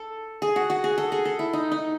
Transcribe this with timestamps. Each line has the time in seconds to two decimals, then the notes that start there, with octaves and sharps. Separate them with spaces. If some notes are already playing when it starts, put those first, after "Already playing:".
Already playing: A4
0.42 G#4
0.56 F#4
0.70 F#4
0.84 G#4
0.98 A4
1.12 G#4
1.25 A4
1.39 E4
1.53 D#4
1.72 D#4